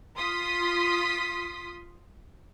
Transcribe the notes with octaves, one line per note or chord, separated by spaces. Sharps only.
F4 C6 D#6 B6